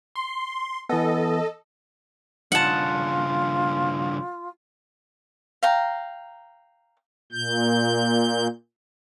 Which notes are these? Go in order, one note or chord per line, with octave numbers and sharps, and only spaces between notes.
C6
E3 B3 A4 D#5
G2 C#3 F4 F#5 A5
F5 G5 A#5
A#2 G6